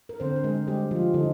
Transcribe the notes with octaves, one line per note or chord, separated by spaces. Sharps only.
A#4
D3 C4 C5
A#4
G#3 G#4
G3 G#3 G4
F3 F4
D3 D#3 D#4